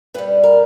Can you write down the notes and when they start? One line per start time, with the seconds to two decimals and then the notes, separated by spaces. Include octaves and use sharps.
0.14 G2 B4
0.18 G3
0.44 A#4